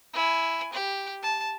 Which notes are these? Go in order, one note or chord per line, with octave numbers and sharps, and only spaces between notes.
E4 G#5
G4
A5